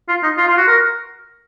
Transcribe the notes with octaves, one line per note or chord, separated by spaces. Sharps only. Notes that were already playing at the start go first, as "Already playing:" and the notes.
F4
D#4
F4
F4
F#4
A#4